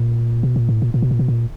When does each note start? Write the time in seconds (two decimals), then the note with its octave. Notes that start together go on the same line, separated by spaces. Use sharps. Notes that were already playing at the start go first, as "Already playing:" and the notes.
Already playing: A#2
0.43 B2
0.56 A#2
0.69 A2
0.82 A#2
0.94 A#2
1.02 B2
1.11 A#2
1.19 B2
1.28 A#2